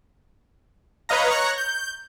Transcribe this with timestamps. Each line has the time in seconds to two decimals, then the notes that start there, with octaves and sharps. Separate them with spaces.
1.09 B4 C#5 D#5 F5 A#5
1.30 C#5 A#5 C#6 F#6
1.58 G6